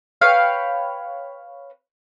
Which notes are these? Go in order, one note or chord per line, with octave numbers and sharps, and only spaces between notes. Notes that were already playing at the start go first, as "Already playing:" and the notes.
B4 C#5 F5 G5